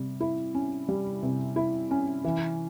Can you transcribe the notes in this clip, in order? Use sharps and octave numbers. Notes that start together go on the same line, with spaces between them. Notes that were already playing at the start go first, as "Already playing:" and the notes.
Already playing: C3 G3
E4
C#4
G3
C3
E4
C#4
E3